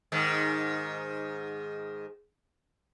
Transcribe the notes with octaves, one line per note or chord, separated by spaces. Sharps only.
G#2 D#3